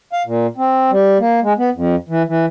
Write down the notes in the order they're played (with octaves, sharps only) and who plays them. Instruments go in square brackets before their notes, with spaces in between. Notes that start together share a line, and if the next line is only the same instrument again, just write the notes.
[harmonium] F5
A#2
C4
G3
A#3
G#3
B3
F2
E3
E3